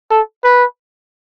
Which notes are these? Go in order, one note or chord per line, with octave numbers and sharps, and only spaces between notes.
A4
B4